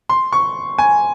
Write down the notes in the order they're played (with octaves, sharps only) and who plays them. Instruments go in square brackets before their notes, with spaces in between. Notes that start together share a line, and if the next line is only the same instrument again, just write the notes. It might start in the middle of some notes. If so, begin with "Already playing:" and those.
[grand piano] C6
C#6
G#5